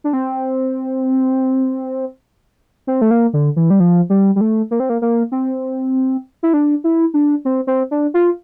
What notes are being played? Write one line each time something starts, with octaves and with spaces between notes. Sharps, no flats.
D4
C4
C4
A3
A#3
D3
E3
G3
F3
G3
G3
A3
A#3
C4
A#3
A#3
C4
E4
D4
E4
D4
C4
C4
D4
F4